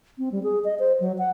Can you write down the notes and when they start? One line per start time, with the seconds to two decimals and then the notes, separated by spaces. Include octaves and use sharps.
0.18 C4
0.32 G3
0.43 G#4
0.65 D#5
0.79 C5
1.00 F#3
1.18 F#5